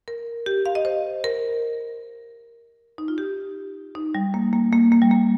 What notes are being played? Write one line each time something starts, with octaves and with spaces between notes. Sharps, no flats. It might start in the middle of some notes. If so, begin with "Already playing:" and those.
A#4
G4
F5
D#5
C5
A#4
D#4
F4
G4
D#4
G3
A#3
A#3
A#3
A#3
G3
A#3